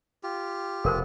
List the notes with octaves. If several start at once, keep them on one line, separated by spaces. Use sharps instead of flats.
F4 G4
F1 B2 A4 A#4 C5